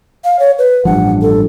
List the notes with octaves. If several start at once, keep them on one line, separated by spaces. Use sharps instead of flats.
F5
C#5
B4
A1 G2 F3 F#5
A4